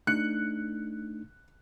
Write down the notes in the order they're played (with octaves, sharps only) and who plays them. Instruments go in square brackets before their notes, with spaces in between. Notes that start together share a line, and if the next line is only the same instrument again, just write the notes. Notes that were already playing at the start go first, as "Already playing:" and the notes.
[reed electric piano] A3 D4 D#4 [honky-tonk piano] F#6 C#7